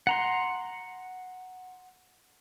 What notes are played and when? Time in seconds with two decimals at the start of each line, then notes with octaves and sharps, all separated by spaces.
0.07 F#5 A#5 C6